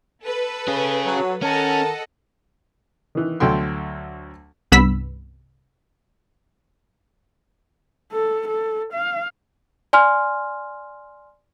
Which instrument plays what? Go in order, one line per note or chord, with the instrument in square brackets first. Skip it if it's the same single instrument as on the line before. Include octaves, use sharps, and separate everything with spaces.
[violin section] A4 B4
[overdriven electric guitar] C#4 G#4
[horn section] F#3
[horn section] D#3 A#4 A5 [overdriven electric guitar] C#4 [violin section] A4 D#5 F#5
[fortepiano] D#3 E3
D2 F#3 A4 G5 C6
[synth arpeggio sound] C2 G2 B3 B5 E6 B6
[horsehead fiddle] A4
A4
F5
[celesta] D5 G#5 C6 F6